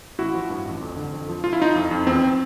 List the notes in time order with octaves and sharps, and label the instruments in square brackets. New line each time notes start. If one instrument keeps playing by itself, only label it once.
[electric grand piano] A1 E4 F#4
F3
G2
A1
F2
D3
F2
F3
F3 F4
E4
F3 D#4 F4
F2
F2
E2 C4